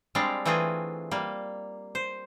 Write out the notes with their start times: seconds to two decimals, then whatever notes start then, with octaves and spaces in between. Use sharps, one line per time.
0.15 G3 G#3 C4 D4 F5
0.45 E3 A3 C4 F4 G#4
1.11 G3 A#3
1.95 C5